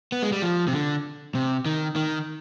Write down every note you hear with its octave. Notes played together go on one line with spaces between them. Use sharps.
B3
G#3
G3
F3
C3
D3
C3
D#3
D#3